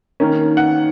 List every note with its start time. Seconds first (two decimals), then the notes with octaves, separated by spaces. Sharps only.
0.20 D#3 A#3 C#4
0.57 F#5